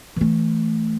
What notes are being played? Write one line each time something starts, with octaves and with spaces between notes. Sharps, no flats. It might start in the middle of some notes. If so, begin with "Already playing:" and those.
E3 A3